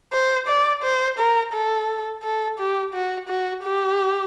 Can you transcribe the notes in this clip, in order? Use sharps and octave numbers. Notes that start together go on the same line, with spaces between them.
C5
D5
C5
A#4
A4
A4
G4
F#4
F#4
G4